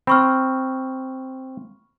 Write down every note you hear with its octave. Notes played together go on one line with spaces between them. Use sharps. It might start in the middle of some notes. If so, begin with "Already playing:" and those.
C4 B5 C#6 F6